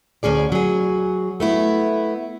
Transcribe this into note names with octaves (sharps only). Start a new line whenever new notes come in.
D2 C#4 G#4 D5
F#3 G#4
A3 B3 E4